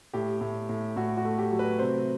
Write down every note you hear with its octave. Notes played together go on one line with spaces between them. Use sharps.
A2 G4
A2
A2
A2 F#4
F#4
A3
G4
F#3
B4
C3 C5